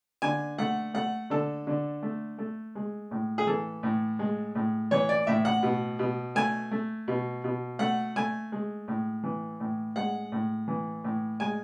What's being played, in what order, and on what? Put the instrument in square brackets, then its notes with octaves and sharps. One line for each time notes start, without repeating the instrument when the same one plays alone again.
[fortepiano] D3 G#5
A3 F#5
A3 F#5
D3 A4
D3
A3
A3
G#3
A2
G#4
E3 A4
A2
G#3
A2
E3 C#5
D5
A2 E5
F#5
B2
B2
A3 G#5
A3
B2
B2
A3 F#5
A3 G#5
G#3
A2
E3
A2
G#3 F#5
A2
E3
A2
G#3 G#5